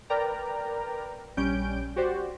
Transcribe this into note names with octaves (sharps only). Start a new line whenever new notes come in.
A#4 B4 D5 G5 A#5
A#1 G3 C#4 G6 D7
F#4 G4 C5 D5